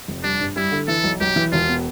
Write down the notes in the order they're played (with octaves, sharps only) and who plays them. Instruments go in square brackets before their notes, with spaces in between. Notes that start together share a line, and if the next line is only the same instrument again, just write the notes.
[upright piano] F1
[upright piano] G3 [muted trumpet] D4
[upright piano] G2
[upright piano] G3 [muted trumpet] E4
[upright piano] D3
[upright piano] E3 [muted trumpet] A4
[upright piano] B1
[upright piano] B1 [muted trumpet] G4
[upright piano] E3
[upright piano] E1 [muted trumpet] F4
[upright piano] B3